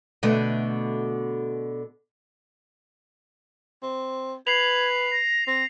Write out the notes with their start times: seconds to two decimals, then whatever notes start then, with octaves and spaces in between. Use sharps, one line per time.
0.23 B2 D3 A3
3.83 C4
4.47 B4 G#6 C7 F7
5.12 A#6
5.47 C4 A#6